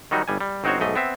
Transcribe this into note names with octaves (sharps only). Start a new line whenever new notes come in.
D#3 F#3 G3 D#4 F#4
G1 G3 G#5
G3
G1 C4 D#4 F#4 C5 C#5
B1 G#2 A3 D#5
B3 C4 E5